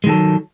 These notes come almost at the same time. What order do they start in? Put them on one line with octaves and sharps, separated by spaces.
G#3 D#3 A4 F#3